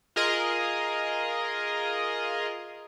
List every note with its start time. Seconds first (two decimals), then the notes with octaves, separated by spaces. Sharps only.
0.16 F4 G#4 A#4 D#5